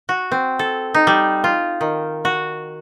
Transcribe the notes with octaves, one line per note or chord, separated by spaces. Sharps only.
F#4
C4
A4
D#4
G3
F4
D#3
F#4